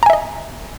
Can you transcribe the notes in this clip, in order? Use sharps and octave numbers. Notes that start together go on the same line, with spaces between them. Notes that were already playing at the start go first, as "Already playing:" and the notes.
D#5 E5 G#5 A#5